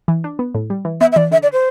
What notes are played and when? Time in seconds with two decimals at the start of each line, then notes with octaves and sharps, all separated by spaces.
0.08 E3
0.24 D4
0.39 B3
0.55 A2
0.70 G3
0.85 E3
1.01 B3 E5
1.12 E5
1.16 E3 D5
1.31 D3 E5
1.43 D5
1.53 C5